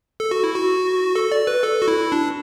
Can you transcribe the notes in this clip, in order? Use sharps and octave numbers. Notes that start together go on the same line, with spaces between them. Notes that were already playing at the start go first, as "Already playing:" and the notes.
A4
F#4
E4
F#4
A4
D5
B4
A4
F#4
E4
D4